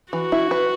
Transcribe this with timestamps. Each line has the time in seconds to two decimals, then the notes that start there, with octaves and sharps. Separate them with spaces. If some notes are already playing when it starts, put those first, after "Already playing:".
0.13 E3 F#4
0.32 E4
0.51 B4